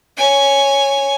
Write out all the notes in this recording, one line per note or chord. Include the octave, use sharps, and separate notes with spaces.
C#5 G#5